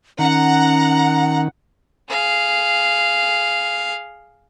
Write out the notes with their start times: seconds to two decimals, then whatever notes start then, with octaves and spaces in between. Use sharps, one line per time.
0.19 D#3 C#4 F#5 A#5
2.10 G#4 F5